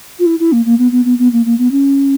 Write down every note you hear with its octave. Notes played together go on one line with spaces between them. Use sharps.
F4
E4
E4
A#3
A#3
B3
B3
B3
B3
A#3
A#3
B3
C#4